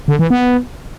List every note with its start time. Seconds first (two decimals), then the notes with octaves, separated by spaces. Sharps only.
0.08 D3
0.19 E3
0.30 B3